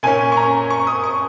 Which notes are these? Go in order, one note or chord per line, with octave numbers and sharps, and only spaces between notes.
A#2 A#3 C#4 G#5
C#6
A#5
C#6
D#6
C#6